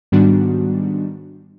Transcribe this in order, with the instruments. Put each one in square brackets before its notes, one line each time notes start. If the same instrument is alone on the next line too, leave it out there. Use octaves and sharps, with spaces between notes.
[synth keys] G#2 D#3 G3 B3 D4 F#4